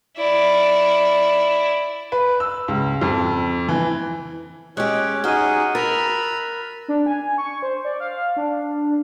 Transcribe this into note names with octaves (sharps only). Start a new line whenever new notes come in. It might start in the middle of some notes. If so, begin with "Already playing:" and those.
E4 D5
B4
E6
C#2
F2
E3
G#3 C#4 G4 C#5 F#6
D#4 F#4 G#4 F6 F#6 D#7
A#4 B5 E6 A6 A#6 F7
D4
G#5
C#6
C5
D5
F5
D4